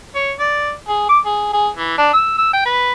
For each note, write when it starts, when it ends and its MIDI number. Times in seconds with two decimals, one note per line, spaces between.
0.15 0.31 73
0.39 0.72 74
0.88 1.05 68
1.09 1.19 86
1.26 1.49 68
1.53 1.69 68
1.76 1.94 52
1.98 2.11 62
2.13 2.37 88
2.38 2.50 88
2.53 2.63 79
2.65 2.92 71